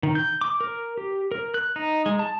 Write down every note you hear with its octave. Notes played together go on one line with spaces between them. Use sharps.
D#3
G6
D6
A#4
G4
A#4
F#6
D#4
G#3
A5